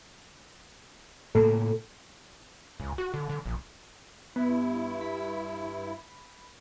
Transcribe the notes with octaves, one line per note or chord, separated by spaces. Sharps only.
A2 C#3 A#3 A4
C#2
F#4
D3
D3
A#1
G2 B3 E4
B5